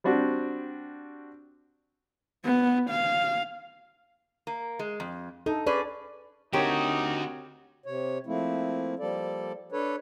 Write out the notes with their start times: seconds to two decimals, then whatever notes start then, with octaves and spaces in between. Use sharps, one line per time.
0.04 G3 C4 D4 F#4
2.45 B3
2.90 F5
4.47 A#3
4.79 G#3
5.00 F2
5.46 D#4 A4
5.67 C#4 G#4 B4 D5
6.53 D3 C4 D#4 F#4 G4 A#4 C#5
7.86 C3 C#5
8.26 F3 A3 A#3 C4 E4
8.99 F3 G3 A#3 A4 D5
9.72 D4 A4 B4 C#5